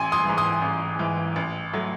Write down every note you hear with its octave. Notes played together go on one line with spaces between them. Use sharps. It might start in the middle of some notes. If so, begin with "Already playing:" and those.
Already playing: A1 G#5 C6
C6 D#6
G#2 E3
C6 D#6
A1
G#2 E3
A1
F#3 A3